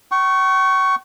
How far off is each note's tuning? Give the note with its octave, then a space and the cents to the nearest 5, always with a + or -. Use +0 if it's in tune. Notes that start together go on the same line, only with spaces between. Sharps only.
G5 -45 C#6 +0